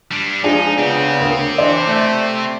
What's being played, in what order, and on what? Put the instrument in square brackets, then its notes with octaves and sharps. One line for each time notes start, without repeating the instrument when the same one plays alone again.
[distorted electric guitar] G3 D4
[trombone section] F3 G#3 [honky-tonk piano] D4 F4 G#4 [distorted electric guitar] D#4
[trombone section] C#3 B3 [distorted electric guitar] C4 G4
[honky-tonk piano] D2 A#4 F7
[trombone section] E3 D4 [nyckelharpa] C5 [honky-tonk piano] D5
[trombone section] A3